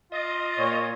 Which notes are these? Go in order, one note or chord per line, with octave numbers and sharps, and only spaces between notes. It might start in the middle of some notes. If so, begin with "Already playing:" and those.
F4 D#5
A#2 C#5